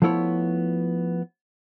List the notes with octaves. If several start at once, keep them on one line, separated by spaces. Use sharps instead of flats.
F3 A3 B3 E4 C#5